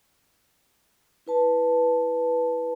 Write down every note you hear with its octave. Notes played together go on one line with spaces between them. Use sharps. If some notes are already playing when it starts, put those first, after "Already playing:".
E4 B4 A5